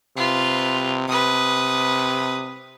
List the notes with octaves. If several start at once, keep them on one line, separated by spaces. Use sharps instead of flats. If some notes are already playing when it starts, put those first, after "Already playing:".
C3 F4 B4
C3 B4 D#6